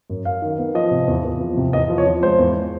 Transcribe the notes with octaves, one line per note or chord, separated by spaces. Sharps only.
F#2
F#2 F5
D#3
B3
F3 D#5
C3
E2
E2
F3
C3
E2 D#5
F3
C#5
F3
G#3 C5
E2